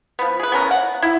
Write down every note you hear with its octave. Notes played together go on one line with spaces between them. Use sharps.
F3 B3
G#4 B4
B3 C#4 A#4
F#5
E4